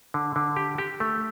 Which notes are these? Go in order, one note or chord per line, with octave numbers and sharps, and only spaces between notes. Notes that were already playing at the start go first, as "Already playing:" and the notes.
D3
D3
G4
G4
A3